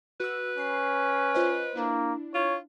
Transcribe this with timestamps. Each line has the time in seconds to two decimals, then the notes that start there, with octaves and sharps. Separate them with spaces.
0.20 F#4 B4 E6
0.58 C#4 B5 C7
1.34 F4 C5 D#5
1.75 A#3 D4 E4
2.34 F4 C#5